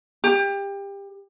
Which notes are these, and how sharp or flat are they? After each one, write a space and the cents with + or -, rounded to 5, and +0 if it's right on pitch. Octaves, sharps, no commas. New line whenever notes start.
G4 +25